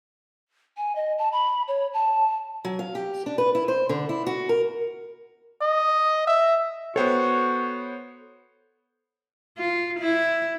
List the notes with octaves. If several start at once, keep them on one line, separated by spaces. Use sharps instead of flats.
G#5
D#5
A5
B5
C#5
A5
F#3
F5
G4
D4
B4
E4
C5
D3
E4
F#4
A#4
D#5
E5
B3 F#4 A4 C5 C#5 G5
F4
E4